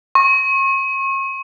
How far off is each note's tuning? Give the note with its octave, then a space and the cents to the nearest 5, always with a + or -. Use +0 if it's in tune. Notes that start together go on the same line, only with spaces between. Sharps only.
C#6 -40